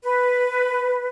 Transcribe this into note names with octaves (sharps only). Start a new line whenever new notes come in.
B4